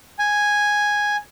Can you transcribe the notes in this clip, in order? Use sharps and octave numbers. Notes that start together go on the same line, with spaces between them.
G#5